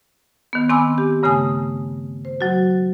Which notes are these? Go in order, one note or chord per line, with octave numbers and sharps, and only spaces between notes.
D#3 B3
D#3 C4 G#5 B5 D6 E6
G4
G2 C#3 A3 G#5 D#6
C5
F#3 F#4